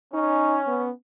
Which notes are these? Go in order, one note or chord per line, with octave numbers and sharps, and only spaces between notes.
C#4 D#4
B3